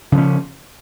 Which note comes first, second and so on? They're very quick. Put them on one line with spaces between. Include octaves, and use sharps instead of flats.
C#3 F3 C#4